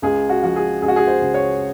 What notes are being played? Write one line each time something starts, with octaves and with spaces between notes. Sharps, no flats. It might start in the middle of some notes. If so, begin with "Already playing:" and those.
C#2 G#4
F#4
F3 F#4
G#4
C#2 G#4
F#4
G#4
C5
C#3
C#5